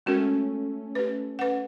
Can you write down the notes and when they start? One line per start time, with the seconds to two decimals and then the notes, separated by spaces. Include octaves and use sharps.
0.06 G#3 A3 C#4 F#4 A4 A#4
0.95 G4 B4
1.39 B4 F#5